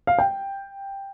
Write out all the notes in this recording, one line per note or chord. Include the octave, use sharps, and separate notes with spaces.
F5
G5